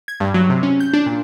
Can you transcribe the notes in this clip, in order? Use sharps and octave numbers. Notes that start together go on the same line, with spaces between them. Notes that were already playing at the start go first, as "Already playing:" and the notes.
G#6
G2
F#3
C3
C#4
G6
D4
A#2